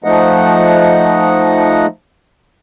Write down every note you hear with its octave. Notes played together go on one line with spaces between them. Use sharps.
F3 A3 D#4 D#5 F#5